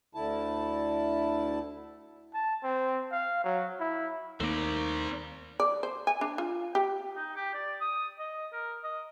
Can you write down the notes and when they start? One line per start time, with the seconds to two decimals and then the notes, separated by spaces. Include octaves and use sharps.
0.15 D2 D3 E4 A5
2.34 A5
2.63 C4
3.12 F5
3.44 F#3
3.80 E4
4.40 D#2 A3 A#3 C4 D#4 D5
5.60 D5
5.83 C5
6.07 G#5
6.21 D4
6.38 F4
6.75 G4
7.16 D#4
7.36 G4
7.54 D5
7.81 D#6
8.19 D#5
8.52 A#4
8.84 D#5